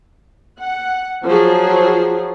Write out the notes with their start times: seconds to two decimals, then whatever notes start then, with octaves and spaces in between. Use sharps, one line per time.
0.59 F#5
1.24 F3 F#3 G#4